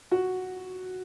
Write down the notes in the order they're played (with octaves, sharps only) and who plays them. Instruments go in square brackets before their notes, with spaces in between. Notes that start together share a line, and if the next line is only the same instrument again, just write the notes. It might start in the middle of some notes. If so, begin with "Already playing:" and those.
[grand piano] F#4